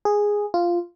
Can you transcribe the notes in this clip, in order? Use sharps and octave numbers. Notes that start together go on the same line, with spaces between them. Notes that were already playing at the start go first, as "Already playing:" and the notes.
G#4
F4